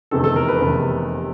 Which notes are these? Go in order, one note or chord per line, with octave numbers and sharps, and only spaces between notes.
F1 E2 C3 D#3 A4
A4
A#4
B4
F1 E2 C3 D#3